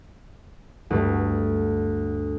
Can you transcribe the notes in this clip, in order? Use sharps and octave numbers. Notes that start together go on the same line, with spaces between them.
D2 G2 A3